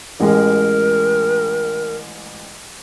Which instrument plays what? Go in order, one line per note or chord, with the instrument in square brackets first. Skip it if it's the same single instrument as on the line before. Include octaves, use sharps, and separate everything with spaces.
[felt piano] A1 G#3 [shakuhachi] A#4